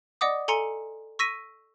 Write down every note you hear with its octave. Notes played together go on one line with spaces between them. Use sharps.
D5 D#5 F#5 D6 D#6
A4 G#5 A#5 C6 C#7 D#7
C#6 E6 A#6 B6 D#7